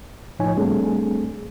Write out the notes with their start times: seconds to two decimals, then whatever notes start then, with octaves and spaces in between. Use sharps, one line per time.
0.39 A2 F3 D#4 C#5 G#5
0.57 G3 A3 C4 D4 G#4 A4